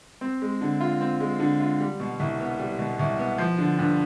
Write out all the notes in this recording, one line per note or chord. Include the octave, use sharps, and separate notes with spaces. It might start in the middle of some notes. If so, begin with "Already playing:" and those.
C4
G#3
D3
F4
C4
G#3
D3
F4
G3
B2
C2
B3
G3
B2
C2
B3
F3
D3
G2